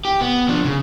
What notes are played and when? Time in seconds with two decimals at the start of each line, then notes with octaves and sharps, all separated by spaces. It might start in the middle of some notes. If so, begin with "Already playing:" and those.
0.05 G4
0.21 B3
0.49 F3 D4
0.64 C#3